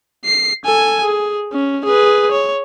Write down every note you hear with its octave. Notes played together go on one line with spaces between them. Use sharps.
C7
A4 G#5
G#4
C#4
G#4 B4
C#5